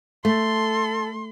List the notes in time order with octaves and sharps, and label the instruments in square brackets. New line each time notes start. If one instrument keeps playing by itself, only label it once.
[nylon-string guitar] A3 [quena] A4 [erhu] C6